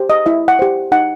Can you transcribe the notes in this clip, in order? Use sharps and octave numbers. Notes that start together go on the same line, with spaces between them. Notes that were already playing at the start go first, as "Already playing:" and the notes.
Already playing: G4 C5
D#5
E4 E5
F#5
G4 C5
D#4 F#5